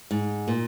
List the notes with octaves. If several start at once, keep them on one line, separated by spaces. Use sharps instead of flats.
G#2
A#2